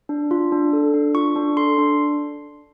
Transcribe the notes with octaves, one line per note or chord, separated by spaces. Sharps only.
D4
F4
D4
A4
D4
F4 C#6
D4
A4 C6
D4